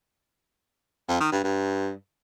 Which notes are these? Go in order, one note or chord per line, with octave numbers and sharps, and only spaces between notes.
F2
D#3
G2
G2